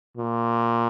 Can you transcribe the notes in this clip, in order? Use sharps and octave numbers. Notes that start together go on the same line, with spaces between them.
A#2